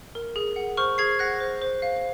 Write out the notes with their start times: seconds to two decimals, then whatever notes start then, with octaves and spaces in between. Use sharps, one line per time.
0.15 A#4
0.36 G#4
0.56 F#5
0.77 C5 C#6 F6
0.98 G#4 G#6 C7
1.19 F#5 F#6 A#6
1.40 C5
1.62 C5
1.82 F5